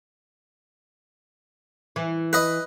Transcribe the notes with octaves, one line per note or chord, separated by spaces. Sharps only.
E3
B4 D#5